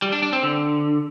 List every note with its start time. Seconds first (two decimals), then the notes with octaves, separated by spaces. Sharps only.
0.02 G3
0.12 D4
0.23 D4
0.33 C4
0.43 D3